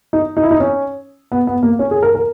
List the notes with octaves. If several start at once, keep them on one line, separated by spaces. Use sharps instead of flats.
D#4
D#4
E4
D#4
C#4
B3
B3
A#3
C#4
G#4
A#4
A#4